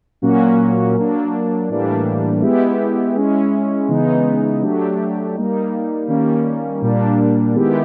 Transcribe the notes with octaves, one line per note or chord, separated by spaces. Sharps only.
A#2 F#3 A#3 C#4 F#4
F#3 A#3 D4
A2 E3 G3 A#3 D4
G#3 B3 E4 G4
G#3 C#4 E4
C#3 E3 G#3 B3 D#4
F#3 A3 D4 G4
G3 A#3 D#4
D#3 G3 A#3 C#4
A#2 G3 A#3 D4
D#3 G#3 B3 E4 G4